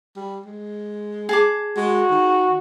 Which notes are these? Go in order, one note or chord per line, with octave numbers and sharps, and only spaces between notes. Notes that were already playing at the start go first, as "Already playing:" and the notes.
G3
G#3
G#4 A5 D6
G#3 F#4
D#3